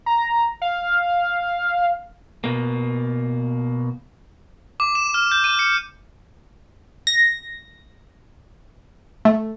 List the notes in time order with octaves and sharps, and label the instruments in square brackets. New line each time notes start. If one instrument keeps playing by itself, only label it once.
[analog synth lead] A#5
F5
[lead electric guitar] B2 A#3
[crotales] D6
E7
F6
G6
D#7
C#7
[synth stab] A#6
A3